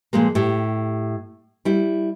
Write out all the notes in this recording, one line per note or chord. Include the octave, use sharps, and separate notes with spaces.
A#2 F3 G#3 A#3
A2 G4
G3 E4